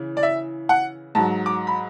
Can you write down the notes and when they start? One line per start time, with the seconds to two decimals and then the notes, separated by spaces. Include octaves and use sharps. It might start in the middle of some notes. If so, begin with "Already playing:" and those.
Already playing: C#3 E3
0.17 D5
0.23 E5
0.69 F#5
1.15 G#2 F#3 A5
1.46 D6
1.67 B5